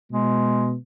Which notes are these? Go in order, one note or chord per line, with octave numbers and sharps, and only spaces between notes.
B2 G#3